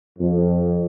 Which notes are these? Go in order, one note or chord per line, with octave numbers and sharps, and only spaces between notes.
F2